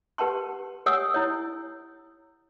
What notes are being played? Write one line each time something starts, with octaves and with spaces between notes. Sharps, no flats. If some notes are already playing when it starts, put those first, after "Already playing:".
G4 B4 F#5 A5 C6
G4 C#5 F#5 G#5 D#6 E6
E4 C#5